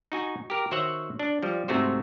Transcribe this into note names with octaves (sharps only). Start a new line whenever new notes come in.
D#4 F#4 G#5
G4 A#4
D#3 F#4 C5 C#5 E5 F#5
D4
F3 G3
C2 G#2 C3 A3 F#4 C5